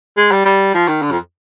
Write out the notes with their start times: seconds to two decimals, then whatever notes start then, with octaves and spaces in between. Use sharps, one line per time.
0.17 G#3
0.31 G3
0.45 G3
0.74 F3
0.88 D#3
1.02 D3
1.11 F2